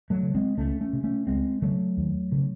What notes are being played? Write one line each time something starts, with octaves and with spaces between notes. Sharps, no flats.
F#3 A3
C#3
G#3 C4
C#2 A3 C#4
A3 C#4
C3
A3 C#4
C#2 G#3 C4
C#3 F#3 A3
D#2
C#3